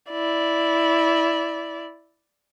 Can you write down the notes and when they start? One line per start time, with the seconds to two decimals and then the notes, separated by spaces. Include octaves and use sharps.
0.11 E4 D5